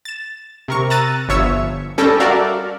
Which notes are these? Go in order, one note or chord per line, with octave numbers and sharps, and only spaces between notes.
A6 E7
C3 A#4 C#6
A#5 E6 F#6 A6 D#7
G1 F3 C#5 E5 E6 C#7
G3 C#4 A4 G5 A#6
F#4 A4 A#4 D5 E5 F5